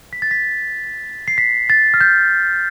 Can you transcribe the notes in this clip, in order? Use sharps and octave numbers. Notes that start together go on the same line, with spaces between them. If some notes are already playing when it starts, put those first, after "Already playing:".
B6
A6
B6
C7
B6
A6
F6
G6